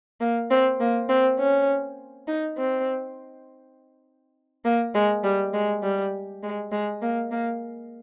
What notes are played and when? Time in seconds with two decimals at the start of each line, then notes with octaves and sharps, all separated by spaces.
0.21 A#3
0.50 C4
0.80 A#3
1.09 C4
1.39 C#4
2.28 D#4
2.58 C4
4.65 A#3
4.95 G#3
5.24 G3
5.54 G#3
5.83 G3
6.43 G#3
6.72 G#3
7.02 A#3
7.31 A#3